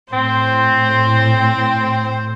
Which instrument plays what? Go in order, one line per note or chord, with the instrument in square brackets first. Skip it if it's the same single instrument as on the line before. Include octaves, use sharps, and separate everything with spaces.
[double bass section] A2 [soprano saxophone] C4 [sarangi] C5